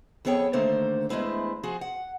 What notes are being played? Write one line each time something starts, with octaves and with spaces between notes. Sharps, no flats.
F2 B3 G#4 A4 C#5 G5
D3 D#3 A3 A#3 A4 C5
E2 G#3 A3 E4 C5
F3 F#4 G#4
F#5